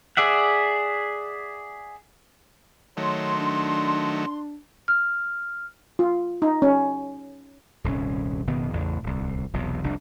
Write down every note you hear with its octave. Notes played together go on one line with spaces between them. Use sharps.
G#4 D5 E5 F#5
D#3 F#3 A3 C#5 C6
D4
F6
F4
D#4
C#4
D#1 C2 G2 C#4
F#1 B2 D#3 B3
A1 E2 C#3 A3
D1 C2
E1 B1 E2 C3
F1 C2 D4